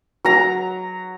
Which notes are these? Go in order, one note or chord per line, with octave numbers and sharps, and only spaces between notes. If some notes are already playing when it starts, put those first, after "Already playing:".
F#3 A#5